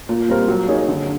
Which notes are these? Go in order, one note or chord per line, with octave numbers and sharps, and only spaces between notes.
A#2
G3 C4 F4 A#4
F#3
A#3 D#4 G#4 C#5
D3